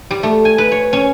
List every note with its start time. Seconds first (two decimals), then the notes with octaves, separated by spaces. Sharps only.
0.11 G3
0.23 A3
0.45 G#5
0.58 B4
0.71 C#5
0.93 C#4